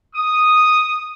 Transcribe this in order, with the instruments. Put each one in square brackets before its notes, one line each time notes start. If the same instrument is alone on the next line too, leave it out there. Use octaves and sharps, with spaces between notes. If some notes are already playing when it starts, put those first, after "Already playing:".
[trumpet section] D#6